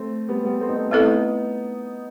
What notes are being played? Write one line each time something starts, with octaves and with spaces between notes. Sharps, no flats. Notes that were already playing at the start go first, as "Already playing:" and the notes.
Already playing: A3 C4
G3 B3
G3 B3
A3 C4
D#4
A3 C4
A3 B3 C4 D#4 E4 A4